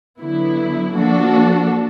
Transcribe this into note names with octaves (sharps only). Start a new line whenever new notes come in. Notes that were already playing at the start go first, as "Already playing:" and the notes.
D3 F#3 B3 E4
F3 A#3 D4 F#4 A4